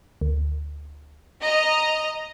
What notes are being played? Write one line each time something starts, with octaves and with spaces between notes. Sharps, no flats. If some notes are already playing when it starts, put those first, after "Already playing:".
D2
D#5 A#5